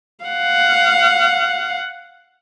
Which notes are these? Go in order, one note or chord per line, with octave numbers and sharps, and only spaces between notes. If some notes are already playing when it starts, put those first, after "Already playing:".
F5 F#5